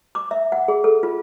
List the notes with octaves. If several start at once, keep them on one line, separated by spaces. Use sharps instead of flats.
D6
E5
F#5
G#4
A4
F4